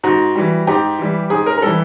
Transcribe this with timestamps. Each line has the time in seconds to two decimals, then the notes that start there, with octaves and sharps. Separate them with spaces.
0.04 G#2 F#4
0.35 E3 G3
0.67 G#2 G4
0.99 E3 G3
1.30 G#2 G#4
1.46 A#4
1.58 A#4
1.62 E3 G3 A4